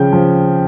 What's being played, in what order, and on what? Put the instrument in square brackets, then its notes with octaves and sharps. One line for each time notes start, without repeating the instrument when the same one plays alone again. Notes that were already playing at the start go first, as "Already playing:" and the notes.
Already playing: [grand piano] C#3 F3 G5
F3